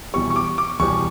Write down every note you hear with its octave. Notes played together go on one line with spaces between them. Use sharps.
E2 B2 G3 C#6
C#6
D6
D6
E2 B2 G3 C#6